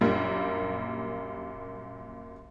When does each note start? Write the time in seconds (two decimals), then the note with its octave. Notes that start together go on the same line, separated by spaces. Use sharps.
0.01 F#2 A#2 G3 A#3 D4